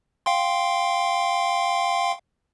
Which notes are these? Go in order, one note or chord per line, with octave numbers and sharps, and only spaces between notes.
F5 G5 C6